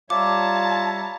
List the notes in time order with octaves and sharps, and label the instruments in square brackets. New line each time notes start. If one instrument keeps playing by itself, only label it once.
[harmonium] G3 C#5 E5 [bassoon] F4 [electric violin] A5 A#5 [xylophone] D6